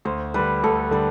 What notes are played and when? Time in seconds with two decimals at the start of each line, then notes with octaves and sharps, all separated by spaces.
0.05 D2 C5
0.34 D3 G3 B4
0.63 D2 A4
0.91 D3 G3 B4